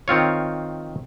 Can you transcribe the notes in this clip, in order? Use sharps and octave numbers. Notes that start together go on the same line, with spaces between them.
D#3 C4 F4 C#5